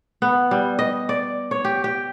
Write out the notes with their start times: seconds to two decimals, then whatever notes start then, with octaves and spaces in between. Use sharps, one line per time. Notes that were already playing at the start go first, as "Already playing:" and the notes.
0.22 B3
0.51 G3
0.79 D#5
1.09 D5
1.51 C#5
1.65 G4
1.84 G4